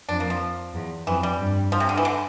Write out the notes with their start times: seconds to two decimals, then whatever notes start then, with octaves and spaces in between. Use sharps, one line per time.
0.09 F2 D4
0.20 A#3
0.30 F3
0.74 E2
1.07 F2 E3
1.23 G3
1.39 G2
1.72 F3
1.80 C3
1.89 D3
1.97 E3
2.05 D3